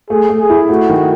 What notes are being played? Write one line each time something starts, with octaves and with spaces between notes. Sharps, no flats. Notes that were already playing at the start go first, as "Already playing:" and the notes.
A3 G#4
A3
G#4
E4
A3 F#4
D#3